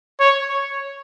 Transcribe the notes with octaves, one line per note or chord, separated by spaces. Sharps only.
C#5